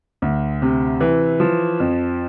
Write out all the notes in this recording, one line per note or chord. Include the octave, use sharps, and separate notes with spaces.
D2
C3
E3
F3
F2